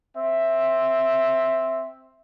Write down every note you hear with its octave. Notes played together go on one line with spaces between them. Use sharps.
C4 E5